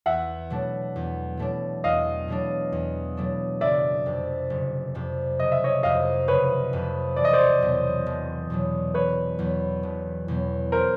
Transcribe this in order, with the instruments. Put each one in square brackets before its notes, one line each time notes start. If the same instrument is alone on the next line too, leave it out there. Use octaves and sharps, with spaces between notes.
[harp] E2 [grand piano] E5 F#5
[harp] B2 F#3 A3 D4
E2
B2 F#3 A3 D4
[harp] E2 [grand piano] D#5 F5
[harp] B2 F#3 A3 D4
E2
B2 F#3 A3 D4
[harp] F#1 [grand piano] D5 E5
[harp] F2 C3
F#1
F2 C3
[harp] F#1 [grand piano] D#5
[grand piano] E5
C#5 D#5
[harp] F2 C3 [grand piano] D#5 F5
[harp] F#1 [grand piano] B4 C#5
[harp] F2 C3
[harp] E1 [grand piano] D5
[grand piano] D#5
C5 D5
[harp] E2 B2 F#3
E1
E2 B2 F#3
[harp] E1 [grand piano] B4 C#5
[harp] E2 B2 F#3
E1
E2 B2 F#3
[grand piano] A#4 C5